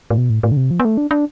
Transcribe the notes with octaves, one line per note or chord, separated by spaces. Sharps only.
A2
B2
A2
A2
D3
C3
F3
B3
A3
D4
D4